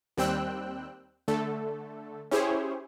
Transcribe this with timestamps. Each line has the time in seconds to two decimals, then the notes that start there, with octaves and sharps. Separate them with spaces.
0.17 D#2 G3 C4 G5 E6 F#6
1.28 D3 A3 A4
2.31 C#4 E4 G4 G#4 C5 C#5